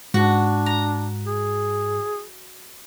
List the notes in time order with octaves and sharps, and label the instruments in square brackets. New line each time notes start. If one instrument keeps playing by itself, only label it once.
[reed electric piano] G#2 [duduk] D4 [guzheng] F#4
[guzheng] A#5
[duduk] G#4